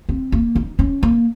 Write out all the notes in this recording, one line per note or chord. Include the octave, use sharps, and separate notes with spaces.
C4
A#3
D#4
C#4
A#3